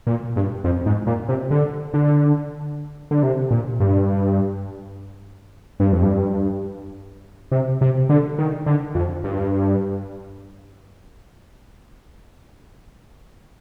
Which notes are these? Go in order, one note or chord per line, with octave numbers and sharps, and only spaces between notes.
A#2
G2
F2
G#2
A#2
C3
D3
D3
D3
C3
A#2
G2
G2
F2
G2
C3
C3
D3
D#3
D3
F2
G2